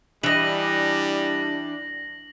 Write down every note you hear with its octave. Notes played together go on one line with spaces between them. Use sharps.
E3 G3 D4 D#5 A#6 F#7